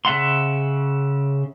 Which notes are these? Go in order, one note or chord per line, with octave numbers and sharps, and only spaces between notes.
C#3 E5 F#5 C6